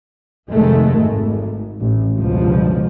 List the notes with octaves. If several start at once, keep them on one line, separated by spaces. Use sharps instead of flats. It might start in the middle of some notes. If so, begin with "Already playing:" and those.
F1 D#3 G#3 A3
G#1
A1
G1 C#2 G2 B2 F3